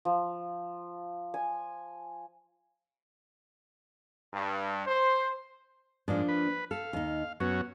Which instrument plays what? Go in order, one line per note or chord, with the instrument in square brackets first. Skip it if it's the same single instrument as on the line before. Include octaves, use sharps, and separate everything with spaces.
[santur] F3
G#5
[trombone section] G2
C5
[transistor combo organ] G#2 [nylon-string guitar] F3 A#3 D4
[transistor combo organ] B4
[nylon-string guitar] A4 [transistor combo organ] F5
[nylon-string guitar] D#2 D#4
[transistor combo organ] F#2 C#4 F#4 [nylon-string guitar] B3